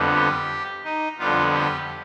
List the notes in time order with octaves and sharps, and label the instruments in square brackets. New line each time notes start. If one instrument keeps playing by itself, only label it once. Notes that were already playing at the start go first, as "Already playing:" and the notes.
Already playing: [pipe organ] F2 D3 G3 B3
G4
D#4
F2 D3 G3 B3 F4
G4